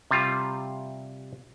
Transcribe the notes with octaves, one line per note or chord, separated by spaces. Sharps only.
C3 G3 F4